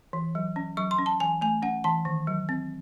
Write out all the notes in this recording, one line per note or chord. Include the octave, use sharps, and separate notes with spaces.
E3
F#3
C#4
F#3 C#6
C6
C#4
A5
E3 G#5
A3 G#5
C#4 F#5
E3 A5
D#3
F#3
C4